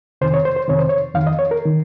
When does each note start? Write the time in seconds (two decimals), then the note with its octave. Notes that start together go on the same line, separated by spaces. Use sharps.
0.21 F2 C3 D#3 C5
0.34 C#5
0.45 C5
0.56 C5
0.68 F2 C3 D#3 C#5
0.79 C5
0.89 C#5
1.15 F2 D#3 F5
1.27 D#5
1.39 C#5
1.51 A#4
1.65 D#3